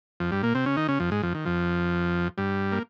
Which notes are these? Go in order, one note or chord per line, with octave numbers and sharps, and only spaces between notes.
F2 F3
G2 G3
A#2 A#3
C3 C4
C#3 C#4
D#3 D#4
C#3 C#4
F2 F3
G#2 G#3
F2 F3
D#3
F2 F3
G2 G3
A#3